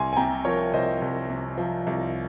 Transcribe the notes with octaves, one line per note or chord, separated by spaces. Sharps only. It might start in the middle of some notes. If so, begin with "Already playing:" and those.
Already playing: C2 G#5 C6
G#5
C3 G5 A#5
F3 A#4 C#5
C2 C5 D#5
C2
C3
F3
C2